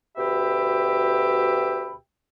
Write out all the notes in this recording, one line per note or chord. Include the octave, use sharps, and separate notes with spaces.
D2 B2 G4 E5 G5 B5